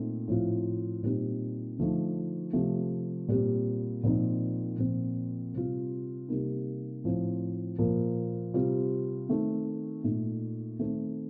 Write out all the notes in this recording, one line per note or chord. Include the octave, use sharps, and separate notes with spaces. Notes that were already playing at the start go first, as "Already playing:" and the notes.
Already playing: A#2 A3 C4 D#4
A2 F3 C4 F4
A#2 G3 C4 D#4
D3 F3 A3 D#4
C3 F3 A3
A#2 G3 C4
A#2 F3 C4 D#4
A#2 F3 C4
C3 G3 C4 F4
C3 G3 A#3 D#4
A2 F3 C4
A#2 F3 A#3
C3 G3 C4 F4
D#3 A3 C4
A#2 A3 D#4
D#3 A3 C4